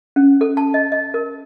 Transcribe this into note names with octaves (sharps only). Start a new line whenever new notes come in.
C#4
A4
A5
D#5
D#5
A#4